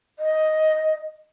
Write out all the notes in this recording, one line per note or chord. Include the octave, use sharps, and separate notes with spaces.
D#5